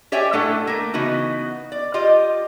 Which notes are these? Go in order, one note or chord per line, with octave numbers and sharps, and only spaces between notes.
G4 C#5 D5 E5 G5 G#5
A2 A3 D4 A4 F#5
A3 A#3
C#3 E3 B3 D#4 F#4
D5
F4 G4 D#5